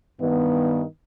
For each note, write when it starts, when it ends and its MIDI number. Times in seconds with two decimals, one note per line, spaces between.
0.21 0.82 43
0.21 0.82 51
0.21 0.82 59